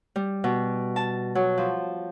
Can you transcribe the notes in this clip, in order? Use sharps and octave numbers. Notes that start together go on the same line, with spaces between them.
G3
B2
A5
F#3
F3